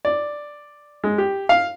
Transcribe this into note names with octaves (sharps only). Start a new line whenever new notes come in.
D5
G#3
G4
F5